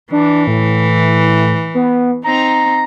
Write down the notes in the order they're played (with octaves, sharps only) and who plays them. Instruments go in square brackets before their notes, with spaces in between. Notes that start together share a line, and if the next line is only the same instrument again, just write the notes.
[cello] E3 [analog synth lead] D4
[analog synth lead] A2
B3
[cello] C4 D#4 [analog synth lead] A#5